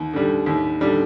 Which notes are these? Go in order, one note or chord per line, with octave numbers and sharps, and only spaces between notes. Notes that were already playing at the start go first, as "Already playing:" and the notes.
Already playing: D#2
D3 G3
D#2
D3 G3